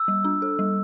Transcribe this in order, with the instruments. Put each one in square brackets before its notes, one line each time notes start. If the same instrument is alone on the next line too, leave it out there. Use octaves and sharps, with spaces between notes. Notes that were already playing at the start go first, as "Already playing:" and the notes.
Already playing: [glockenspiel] E6
[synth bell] G3
D4
A4
G3